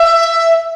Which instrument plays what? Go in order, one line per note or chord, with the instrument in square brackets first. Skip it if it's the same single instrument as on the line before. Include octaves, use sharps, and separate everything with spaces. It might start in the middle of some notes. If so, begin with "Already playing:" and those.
Already playing: [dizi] E5